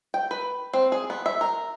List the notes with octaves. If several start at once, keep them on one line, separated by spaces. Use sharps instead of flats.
G5
B4
C4
G#4
B3
E5
A#4